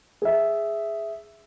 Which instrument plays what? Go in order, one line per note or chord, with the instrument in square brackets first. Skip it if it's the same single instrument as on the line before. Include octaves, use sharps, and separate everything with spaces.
[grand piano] G#4 E5